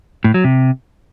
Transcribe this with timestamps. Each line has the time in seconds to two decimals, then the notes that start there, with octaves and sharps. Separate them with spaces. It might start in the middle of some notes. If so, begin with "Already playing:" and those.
0.24 A2
0.34 F#3
0.44 C3